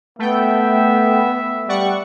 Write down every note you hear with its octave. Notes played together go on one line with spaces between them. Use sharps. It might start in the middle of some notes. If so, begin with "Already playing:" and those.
A3 B3 E5 G5
G3 D5 F#5 C#6